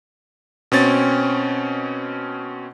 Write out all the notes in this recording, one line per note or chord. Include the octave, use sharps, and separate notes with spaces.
B2 C4 C#4 A6